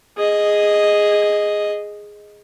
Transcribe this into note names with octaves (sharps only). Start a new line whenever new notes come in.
G#4 D#5